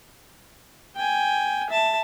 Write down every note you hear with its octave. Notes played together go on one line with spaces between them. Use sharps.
G5 G#5
E5 A5